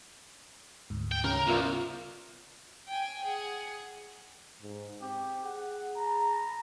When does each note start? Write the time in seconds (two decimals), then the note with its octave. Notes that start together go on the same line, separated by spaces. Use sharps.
0.90 D2 G#2
1.12 G5
1.24 C#2 C#3 A#4
1.47 C2 B3 F4 A#4 E5
2.88 G5 G#5
3.24 G#4 F#5
4.62 G#2
5.01 C4 G4
5.44 G#4 F#5
5.96 A#5